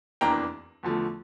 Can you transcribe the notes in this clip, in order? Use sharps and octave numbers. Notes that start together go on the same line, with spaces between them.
F1 E2 E3 A#3 D4 G5 A#5
E2 D3 F3 A3